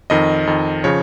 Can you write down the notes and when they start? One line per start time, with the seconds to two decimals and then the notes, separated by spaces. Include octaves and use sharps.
0.10 F2 D#3 D#5
0.47 F2 D#3
0.84 C#3 F3 C#5